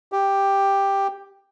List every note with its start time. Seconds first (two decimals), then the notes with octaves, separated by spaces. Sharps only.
0.12 G4